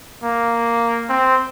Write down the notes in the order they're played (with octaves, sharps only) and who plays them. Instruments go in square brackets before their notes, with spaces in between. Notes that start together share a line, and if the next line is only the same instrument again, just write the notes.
[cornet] A#3
C4